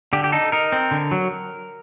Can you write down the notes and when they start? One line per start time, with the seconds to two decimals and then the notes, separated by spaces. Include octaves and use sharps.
0.13 D3 G4
0.24 G4
0.32 D#4 A4
0.52 D#4 A#4
0.72 C4
0.91 D3
1.11 F#3